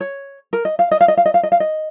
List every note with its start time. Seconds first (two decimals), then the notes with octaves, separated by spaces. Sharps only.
0.01 C#5
0.53 A#4
0.65 D#5
0.79 F5
0.91 D#5
1.01 F5
1.08 D#5
1.17 F5
1.26 D#5
1.34 F5
1.43 D#5
1.52 F5
1.60 D#5